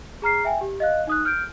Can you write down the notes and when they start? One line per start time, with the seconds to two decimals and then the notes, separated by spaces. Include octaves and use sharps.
0.22 G#4 A#5 F6 C7
0.45 E5 G5 G#5
0.61 G4
0.80 D#5 F5 F#6
1.07 D#4 D#6 F#6
1.25 F6 G6 D7